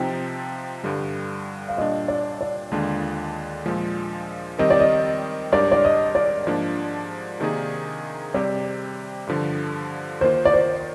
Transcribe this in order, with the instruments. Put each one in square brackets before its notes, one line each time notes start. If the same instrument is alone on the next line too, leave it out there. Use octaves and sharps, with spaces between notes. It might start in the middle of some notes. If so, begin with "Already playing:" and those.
Already playing: [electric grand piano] C3 F3 C4 D#4 [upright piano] G5
[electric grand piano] G2 D3 G3
[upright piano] F5
[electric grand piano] A#2 G3 D4 [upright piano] D#5
[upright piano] D5
D5
[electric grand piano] D#2 D3 G#3 D4 F4
A#2 F3 G#3
[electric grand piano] D#3 G3 C4 G4 A#4 [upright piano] D#5
[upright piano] D5
D#5
[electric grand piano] G#2 G3 D4 G4 A#4 [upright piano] D5
[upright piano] D5
D#5
D5
[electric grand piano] G#2 F3 A#3 D4
C3 D#3 A#3 D#4 G#4
[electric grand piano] C3 G3 C4 G4 [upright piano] D5
[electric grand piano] G2 D3 F3
[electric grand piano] D#3 A#3 F4 [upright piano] C5
[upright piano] D5
C5